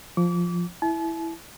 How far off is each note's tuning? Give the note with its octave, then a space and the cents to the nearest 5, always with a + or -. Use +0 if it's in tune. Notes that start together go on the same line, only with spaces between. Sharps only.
F3 +0 D6 -30
E4 +0 A5 -45